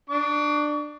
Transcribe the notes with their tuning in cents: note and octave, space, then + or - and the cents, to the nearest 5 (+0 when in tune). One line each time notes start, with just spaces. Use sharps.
D4 +15 C#6 +40